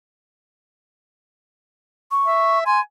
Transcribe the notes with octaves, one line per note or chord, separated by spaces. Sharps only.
C#6
E5
G#5 C6